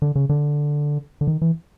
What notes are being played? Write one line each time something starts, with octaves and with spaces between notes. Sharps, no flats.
D3
C#3
D3
D3
D#3
E3